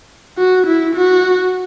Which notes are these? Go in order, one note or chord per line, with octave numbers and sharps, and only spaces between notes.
F#4
E4
F#4